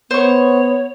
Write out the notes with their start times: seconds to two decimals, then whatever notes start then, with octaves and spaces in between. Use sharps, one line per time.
0.11 B3 C5 C#5 C#6